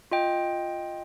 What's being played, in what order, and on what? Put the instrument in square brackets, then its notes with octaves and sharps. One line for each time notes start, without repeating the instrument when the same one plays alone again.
[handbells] F4 D#5 G5